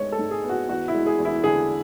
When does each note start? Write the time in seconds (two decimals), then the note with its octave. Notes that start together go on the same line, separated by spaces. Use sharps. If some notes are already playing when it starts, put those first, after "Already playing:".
Already playing: G#2 G#3 B3 C#5
0.12 A4
0.19 G#2
0.31 G#4
0.43 B3
0.49 F#4
0.69 E2 F#4
0.88 E4
0.94 G#3
1.06 G#4
1.19 E2
1.25 E4
1.44 D3 G#4